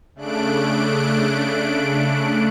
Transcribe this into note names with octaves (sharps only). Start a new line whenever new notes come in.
C#3 A3 D4 F#6 D7